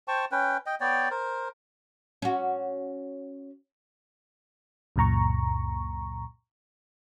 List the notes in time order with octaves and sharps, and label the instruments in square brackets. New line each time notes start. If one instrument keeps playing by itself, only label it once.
[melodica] C5 G5 A5 C#6
C#4 B4 G5
D#5 G5
B3 C#5 D5 G5
A#4 C5
[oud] C#4 F#4
[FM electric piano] C#2 F#2 A#2 A#5 C#6